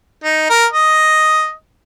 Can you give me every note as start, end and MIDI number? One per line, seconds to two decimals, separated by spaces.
0.24 0.46 63
0.50 0.65 70
0.73 1.52 75